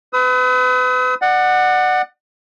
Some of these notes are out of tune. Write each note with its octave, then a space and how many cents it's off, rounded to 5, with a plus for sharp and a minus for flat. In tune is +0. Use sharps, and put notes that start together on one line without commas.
B4 +35 D#6 +45
D5 +35 F#5 +0